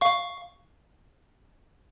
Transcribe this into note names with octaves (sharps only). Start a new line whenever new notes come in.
F5 C#6